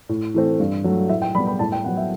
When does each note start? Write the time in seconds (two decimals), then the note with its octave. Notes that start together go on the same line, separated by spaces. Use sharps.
0.09 A2
0.34 E3 A3 C4
0.60 G2
0.84 F#3 A3
1.09 A2 E5
1.22 G5
1.35 G3 B5
1.38 B3
1.47 B5
1.59 A2 A5
1.72 G5
1.84 F#3 B3 F#5
1.97 E5